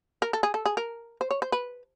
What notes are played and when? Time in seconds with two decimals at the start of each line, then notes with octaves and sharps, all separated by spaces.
0.22 A#4
0.33 A4
0.43 G#4
0.54 A4
0.66 G#4
0.77 A#4
1.21 C5
1.31 C#5
1.42 C5
1.52 B4